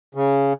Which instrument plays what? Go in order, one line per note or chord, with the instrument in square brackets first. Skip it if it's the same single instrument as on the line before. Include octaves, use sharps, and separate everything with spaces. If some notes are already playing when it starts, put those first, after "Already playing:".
[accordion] C#3